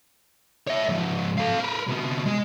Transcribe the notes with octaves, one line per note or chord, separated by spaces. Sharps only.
C#5 E5
G#2 F3
A4 F5
A#4 B4
C3 B3
G#3 D#5